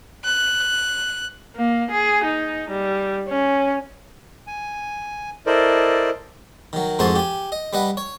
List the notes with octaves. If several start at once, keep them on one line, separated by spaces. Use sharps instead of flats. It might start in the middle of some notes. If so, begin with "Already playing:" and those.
F#6
A#3
G#4
D#4
G3
C#4
G#5
E4 A4 A#4 C5 D5 D#5
D#3 F#3
F2 G#2 F#4 C5 G#5 A5
G4 G#5
D#5
G3 B4 D#5 F#5
C#5